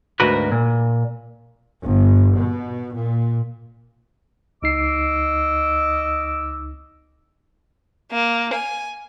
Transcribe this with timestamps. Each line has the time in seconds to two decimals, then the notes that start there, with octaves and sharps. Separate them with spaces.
0.20 D2 G#2 F#4 A#4 B4
0.52 A#2
1.82 G1
2.37 B2
2.95 A#2
4.63 C#2 D#4 D#5 D6 E6 C7
8.12 A#3
8.53 G#5